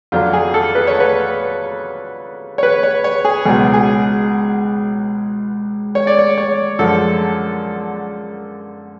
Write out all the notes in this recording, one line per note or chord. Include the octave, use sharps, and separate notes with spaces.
F2 D3 F#3 F4
G#4
A4
B4
C#5
B4
C#5
B4
C#5
C#5
G#4
C#2 B2 F#3 G#4
G#4
C#5
D5
C#5
C#5
F#2 D3 F3 G#3 A4